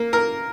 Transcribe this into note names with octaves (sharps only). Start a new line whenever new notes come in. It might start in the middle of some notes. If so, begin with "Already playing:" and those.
Already playing: A#3
A#4